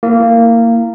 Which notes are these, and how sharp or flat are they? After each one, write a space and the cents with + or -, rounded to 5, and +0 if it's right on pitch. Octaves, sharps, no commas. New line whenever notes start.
A#3 -15 E4 +0